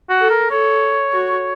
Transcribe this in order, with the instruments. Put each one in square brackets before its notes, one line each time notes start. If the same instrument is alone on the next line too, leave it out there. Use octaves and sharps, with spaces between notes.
[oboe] F#4
[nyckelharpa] A4
[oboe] A#4
[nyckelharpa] A4 [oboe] C#5
[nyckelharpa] F#4